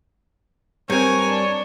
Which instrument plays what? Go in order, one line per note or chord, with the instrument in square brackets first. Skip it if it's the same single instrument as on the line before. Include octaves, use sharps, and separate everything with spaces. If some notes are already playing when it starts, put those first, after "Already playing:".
[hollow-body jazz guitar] G2 C4 [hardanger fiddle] A#4 G#5 [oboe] C#5
[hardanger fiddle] D4